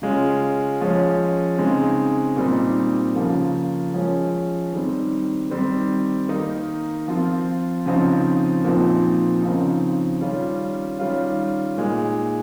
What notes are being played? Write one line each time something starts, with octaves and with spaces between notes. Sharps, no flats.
C#3 G#3 C#4 F4
F3 G#3 C#4
C#3 G#3 C4 D#4
A#2 G3 C4 D#4
C#3 F3 A#3
F3 G#3 C#4
D#3 G3 C4
D#3 G3 C4
D#3 A#3 D#4
F3 C4 F4
C#3 F3 C4 D#4
A#2 F3 C4 D#4
C#3 F3 C4 D#4
D#3 G3 C#4 F4
D#3 G3 C#4 F4
A#2 G#3 D#4